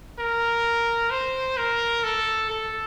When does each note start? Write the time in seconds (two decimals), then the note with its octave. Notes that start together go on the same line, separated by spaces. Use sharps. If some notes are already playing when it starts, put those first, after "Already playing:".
0.18 A#4
1.10 C5
1.57 A#4
2.04 A4
2.49 A4